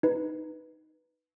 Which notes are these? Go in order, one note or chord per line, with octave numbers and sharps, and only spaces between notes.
D#4 B4